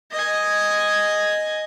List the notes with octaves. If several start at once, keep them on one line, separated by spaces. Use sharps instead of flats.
D#5 G#5